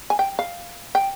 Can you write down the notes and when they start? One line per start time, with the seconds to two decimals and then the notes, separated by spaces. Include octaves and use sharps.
0.10 G#5
0.19 G5
0.39 F5
0.95 G5